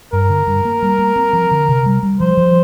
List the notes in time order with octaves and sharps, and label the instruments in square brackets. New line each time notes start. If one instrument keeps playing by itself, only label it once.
[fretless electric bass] G2 [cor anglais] A#4
[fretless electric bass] D3
G2
A#3
G3
A#3
C4
F3
D3
C3
G3
G3
[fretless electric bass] F3 [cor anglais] C5
[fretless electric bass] F3